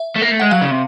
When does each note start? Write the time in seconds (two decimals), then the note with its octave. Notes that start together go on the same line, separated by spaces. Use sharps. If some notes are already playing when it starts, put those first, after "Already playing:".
Already playing: E5
0.16 A3
0.22 A#3
0.32 A3
0.40 G#3 F#5
0.51 F#3 F5
0.61 C#3
0.71 C3